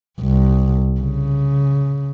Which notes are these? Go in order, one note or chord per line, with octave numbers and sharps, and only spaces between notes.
C2
C#3